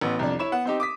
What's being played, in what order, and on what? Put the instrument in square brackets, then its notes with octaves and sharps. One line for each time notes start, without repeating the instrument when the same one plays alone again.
[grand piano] A1 B3 B4
C2 F2 D4
E4 C#5 E7
B3 F#5
C4 D#4 G4
D6 D#6 B6